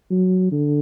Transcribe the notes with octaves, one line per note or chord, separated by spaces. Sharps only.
F#3
D3